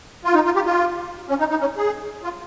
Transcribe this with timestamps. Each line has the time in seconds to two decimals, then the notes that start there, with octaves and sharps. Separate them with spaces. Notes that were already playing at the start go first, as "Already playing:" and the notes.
0.25 F4
0.34 D#4
0.45 F4
0.55 G4
0.66 F4
1.29 C#4
1.40 D#4
1.50 D#4
1.61 C#4
1.77 G#4
2.24 F4